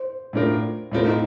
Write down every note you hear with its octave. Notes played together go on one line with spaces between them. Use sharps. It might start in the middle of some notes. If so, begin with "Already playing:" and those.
Already playing: C5
A2 A3 D4 F4 A#4
A2 A3 C4 F4 A#4
D#4